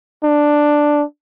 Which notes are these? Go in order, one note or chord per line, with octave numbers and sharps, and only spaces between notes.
D4